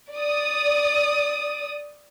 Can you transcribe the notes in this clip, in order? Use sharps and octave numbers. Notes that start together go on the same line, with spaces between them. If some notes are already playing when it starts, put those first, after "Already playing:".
D5 D#6